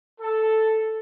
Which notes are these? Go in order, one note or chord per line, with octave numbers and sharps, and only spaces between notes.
A4